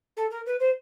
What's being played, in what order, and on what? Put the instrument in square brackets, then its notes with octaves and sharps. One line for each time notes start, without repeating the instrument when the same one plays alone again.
[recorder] A4
A#4
B4
C5